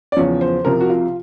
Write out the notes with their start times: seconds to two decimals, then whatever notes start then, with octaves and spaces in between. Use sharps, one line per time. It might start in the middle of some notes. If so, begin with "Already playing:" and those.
0.12 D5
0.17 E2 C#3 F3 C#5
0.41 C5
0.65 C2 C3 F3 A#4
0.80 F#4
0.90 F4